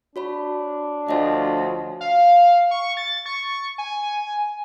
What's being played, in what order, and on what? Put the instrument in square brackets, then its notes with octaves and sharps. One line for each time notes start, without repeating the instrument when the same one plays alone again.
[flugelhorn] D4 [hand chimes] F#4 C#5 B5
[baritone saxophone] D2 [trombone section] F3 [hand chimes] C#5 D#5
[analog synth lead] F5
C#6
A6
C#6
G#5